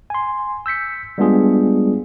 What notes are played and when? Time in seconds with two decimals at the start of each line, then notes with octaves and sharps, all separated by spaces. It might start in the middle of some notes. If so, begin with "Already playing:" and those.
0.10 G#5 C6
0.66 E6 G6 B6 C#7
1.18 G3 G#3 B3 D4 F4 G#4